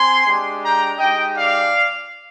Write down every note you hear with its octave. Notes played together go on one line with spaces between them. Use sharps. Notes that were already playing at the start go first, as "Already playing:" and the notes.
Already playing: C4 G#5 C6
G#3 D4 G4
G5 A#5
G#3 D#4 G4 D#5 G5
D5 F5